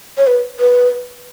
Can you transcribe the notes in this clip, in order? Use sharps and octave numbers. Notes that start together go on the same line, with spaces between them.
C#5
B4
B4